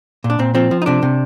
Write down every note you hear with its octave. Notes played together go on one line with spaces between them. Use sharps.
A#2
D4
A#2 C4
F3 C4
F3
D#4
C3 D4
C3